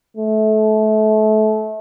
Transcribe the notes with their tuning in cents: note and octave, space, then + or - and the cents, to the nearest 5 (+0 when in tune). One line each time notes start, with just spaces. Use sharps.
A3 -30